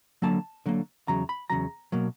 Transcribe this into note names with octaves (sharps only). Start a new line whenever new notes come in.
D3 F#3 A#3 A5
D3 F#3 A#3
E2 C#3 F#3 A#5
B5
E2 C#3 F#3 A#5
B2 F#3 A#3